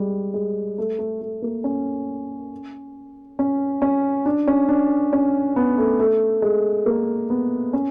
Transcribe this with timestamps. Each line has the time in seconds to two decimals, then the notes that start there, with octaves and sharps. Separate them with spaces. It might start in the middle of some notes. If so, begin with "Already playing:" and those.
Already playing: G3 G#3
0.34 G#3
0.78 A3
0.99 A3
1.21 A3
1.42 A#3
1.64 C#4
3.39 C#4
3.82 C#4
4.26 D4
4.47 C#4
4.69 D4
5.13 C#4
5.56 B3
5.78 A3
5.99 A3
6.42 G#3
6.86 A#3
7.30 B3
7.73 C#4